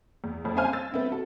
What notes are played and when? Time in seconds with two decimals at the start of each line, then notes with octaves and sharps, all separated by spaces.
0.24 E2
0.44 F#1 F2
0.56 C4 C#4 C5 F5 G#5 F6
0.73 E6 A6
0.92 B3 C4 E4
1.11 F#4 A4